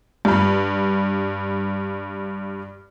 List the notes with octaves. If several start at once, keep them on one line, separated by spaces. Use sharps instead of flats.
G2 B5